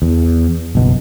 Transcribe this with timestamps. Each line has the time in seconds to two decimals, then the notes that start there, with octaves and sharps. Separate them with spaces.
0.02 E2
0.75 F#1 B1 B2